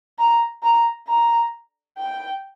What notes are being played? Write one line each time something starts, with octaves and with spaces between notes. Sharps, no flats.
A#5
A#5
A#5
G5